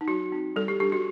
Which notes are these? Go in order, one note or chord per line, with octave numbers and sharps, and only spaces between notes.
D#4
F#3 F#4
C4 D#4
G3 A4
G4
D4 G4
F#4